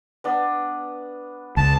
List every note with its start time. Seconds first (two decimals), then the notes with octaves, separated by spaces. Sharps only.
0.24 B3 D4
1.57 C#2 A5